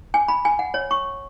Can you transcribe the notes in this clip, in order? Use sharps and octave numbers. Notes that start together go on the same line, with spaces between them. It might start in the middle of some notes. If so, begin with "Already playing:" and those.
G#5
B5
G#5
F#5
C#5
C#6